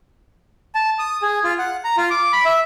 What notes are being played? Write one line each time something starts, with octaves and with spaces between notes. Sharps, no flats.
A5
D#6
G#4
F4
F#5
A#5
F4
D6
B5
E5